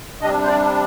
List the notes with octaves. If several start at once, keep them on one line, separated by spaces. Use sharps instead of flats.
C3 G3 D4 D#5
C5
D5